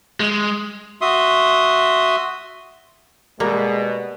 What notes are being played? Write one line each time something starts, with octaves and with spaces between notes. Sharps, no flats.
G#3
F#4 E5 C6 D#6
B2 G3 G#3 A#3